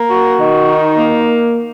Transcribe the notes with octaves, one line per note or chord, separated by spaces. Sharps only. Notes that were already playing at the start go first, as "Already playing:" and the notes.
Already playing: A#3
F#4
D#3
D#4
A#3